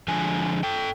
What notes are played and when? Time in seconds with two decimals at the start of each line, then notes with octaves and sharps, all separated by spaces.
0.08 D3 F3 G#3 G#5
0.63 A4 G5